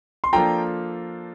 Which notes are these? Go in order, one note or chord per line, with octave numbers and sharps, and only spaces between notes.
C6
F3 A#3 D4 F4 A4 G5 A#5